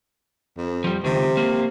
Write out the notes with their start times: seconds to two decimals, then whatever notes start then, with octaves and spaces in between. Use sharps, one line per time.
0.57 F2
0.84 F3 G3
1.04 C#2 C3 D#3
1.37 A#3 C4